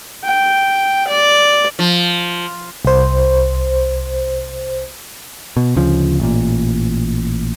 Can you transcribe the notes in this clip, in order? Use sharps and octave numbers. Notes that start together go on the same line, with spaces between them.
G5
D5
F3
C2 C5
B2
D2 C#3 F3
A1 A#2